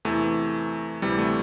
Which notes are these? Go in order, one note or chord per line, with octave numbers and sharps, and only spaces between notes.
E2 C3 E3 A3
D2 C3 E3 G3
A3